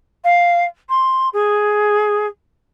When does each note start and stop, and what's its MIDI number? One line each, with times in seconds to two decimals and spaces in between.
0.24 0.64 77
0.89 1.29 84
1.33 2.26 68